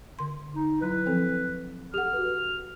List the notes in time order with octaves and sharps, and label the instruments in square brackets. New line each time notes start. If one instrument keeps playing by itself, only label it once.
[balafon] D3 C6
[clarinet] D#4
[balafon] F#3 E4 [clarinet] B4
[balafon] F3 C4 A4
[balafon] G4 A4 F#5 [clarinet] F6
[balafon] F#4 B4